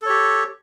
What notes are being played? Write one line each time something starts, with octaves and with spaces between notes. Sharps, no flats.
G4 A4 C#5